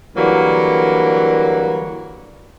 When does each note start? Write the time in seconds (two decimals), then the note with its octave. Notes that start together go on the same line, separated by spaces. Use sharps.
0.15 D3 E3 F#3 G3 A#3